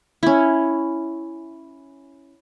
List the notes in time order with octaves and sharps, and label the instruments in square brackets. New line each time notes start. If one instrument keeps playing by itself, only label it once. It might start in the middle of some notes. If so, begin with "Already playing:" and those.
[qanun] C#4 E4